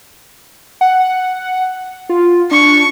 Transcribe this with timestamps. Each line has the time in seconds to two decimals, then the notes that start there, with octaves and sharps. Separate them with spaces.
0.81 F#5
2.09 F4
2.51 D4 C#6